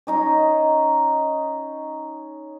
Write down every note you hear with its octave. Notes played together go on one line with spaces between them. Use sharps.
C#4 D#4 A#5